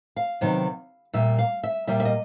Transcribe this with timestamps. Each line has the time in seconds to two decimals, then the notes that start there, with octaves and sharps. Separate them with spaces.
0.16 F5
0.41 C3 D#3 F#3 B3 D#4
1.13 A#2 G3 A#3 E5
1.39 F5
1.63 E5
1.87 A#2 G3 A#3 E5
2.00 E5
2.05 D#5